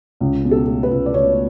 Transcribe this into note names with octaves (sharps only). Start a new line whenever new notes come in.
C#2
B2
A4
A3
B4
C#2
D5
C#2 C#5